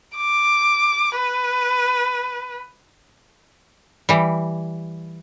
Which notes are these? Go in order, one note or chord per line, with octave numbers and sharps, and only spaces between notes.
D6
B4
E3 G3